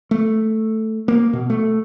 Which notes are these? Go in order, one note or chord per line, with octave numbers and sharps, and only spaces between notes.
A3
A#3
B2
A3